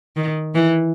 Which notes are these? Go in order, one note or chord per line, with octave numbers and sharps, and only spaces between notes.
D#3
E3